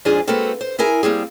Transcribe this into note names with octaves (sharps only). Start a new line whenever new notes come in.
F2 G#2 F3 D4 G#4 G#5
G#3 A#3 C4 F#4 A4 B4
C5
E4 G#4 A#4 G#5
G3 A#3 C4 G#4